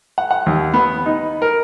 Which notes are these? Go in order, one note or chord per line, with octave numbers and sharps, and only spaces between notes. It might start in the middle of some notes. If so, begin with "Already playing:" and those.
F#5
F#5
D#2
B3
D#4
A#4